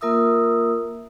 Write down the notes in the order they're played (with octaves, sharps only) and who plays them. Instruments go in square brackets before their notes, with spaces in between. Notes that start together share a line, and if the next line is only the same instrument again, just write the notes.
[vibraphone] A#3 F4 A#4 E5 D#6 E6